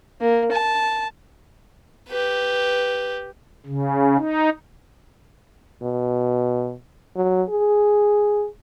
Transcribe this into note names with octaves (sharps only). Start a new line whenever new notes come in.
A#3
A5
G4 B4
C#3
D#4
B2
F#3
G#4